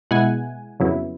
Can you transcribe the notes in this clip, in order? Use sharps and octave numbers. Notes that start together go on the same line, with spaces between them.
B2 G#3 B3 E4 F#5 G#5
F2 C#3 F#3 B3 E4